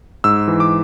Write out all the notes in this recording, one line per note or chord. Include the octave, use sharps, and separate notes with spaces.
G#2 E6
E3
D6